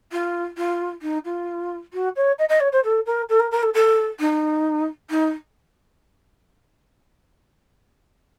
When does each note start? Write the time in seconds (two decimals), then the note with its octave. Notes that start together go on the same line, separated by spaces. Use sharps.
0.12 F4
0.57 F4
1.02 D#4
1.25 F4
1.93 F#4
2.16 C#5
2.38 D#5
2.49 D#5
2.60 C#5
2.72 C5
2.84 A4
3.06 A#4
3.29 A4
3.39 A#4
3.51 A#4
3.63 A4
3.74 A4
4.20 D#4
5.10 D#4